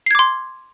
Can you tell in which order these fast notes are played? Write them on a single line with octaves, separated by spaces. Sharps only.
C7 G#6 D6 C6